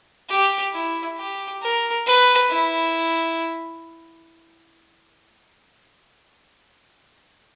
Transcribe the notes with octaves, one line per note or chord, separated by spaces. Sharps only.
G4
E4
G4
A#4
B4
E4